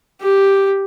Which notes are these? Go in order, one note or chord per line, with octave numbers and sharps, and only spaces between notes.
G4